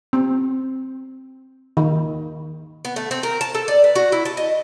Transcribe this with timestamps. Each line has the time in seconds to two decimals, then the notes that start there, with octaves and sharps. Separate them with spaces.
0.13 C4
1.77 D#3
2.85 B3
2.96 A3
3.11 C4
3.23 A#4
3.41 A5
3.55 A4
3.68 D5
3.84 B4
3.96 F#4
4.12 E4
4.25 A5
4.37 D#5